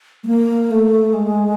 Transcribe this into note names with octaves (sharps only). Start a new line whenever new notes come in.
A3
A#3
A3
G#3